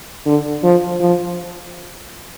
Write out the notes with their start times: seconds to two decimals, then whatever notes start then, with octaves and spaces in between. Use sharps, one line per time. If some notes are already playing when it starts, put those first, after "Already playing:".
0.26 D3
0.64 F3
1.01 F3